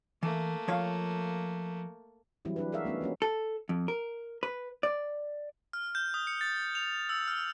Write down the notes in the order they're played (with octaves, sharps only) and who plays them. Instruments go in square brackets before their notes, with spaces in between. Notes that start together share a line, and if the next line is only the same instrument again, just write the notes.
[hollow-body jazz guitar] E3 [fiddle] A3 A#3
[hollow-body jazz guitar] F3 C#5 F5
[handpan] E3 F#3 G3 C4 E4
F#3 D4 B4
F#4 G#4 A#4 E5 F5
A3 B3 C#4 D#4
F3 A#3 C#4 F#4
[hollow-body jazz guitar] A4
F2
A#4
B4
D5
[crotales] F6
G6
D#6
C#7
A6
F7
E6
F6